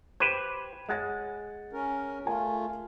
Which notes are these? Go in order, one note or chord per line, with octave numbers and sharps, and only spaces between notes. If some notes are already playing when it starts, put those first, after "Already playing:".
G4 B4 C5 G#6
G#3 C#5 F#5 A6
C#4 A#4
A3 F4 A#4 G#5